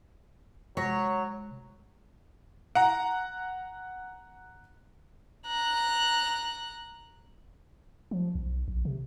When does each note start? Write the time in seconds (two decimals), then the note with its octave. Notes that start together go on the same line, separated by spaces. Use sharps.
0.77 C3 F#3 G#3 C#5 A#6
2.75 F#5 A#5
5.47 A#5 F#6
8.11 F3
8.35 B1
8.68 A#1
8.85 C3